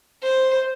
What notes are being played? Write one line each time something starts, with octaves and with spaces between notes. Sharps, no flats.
C5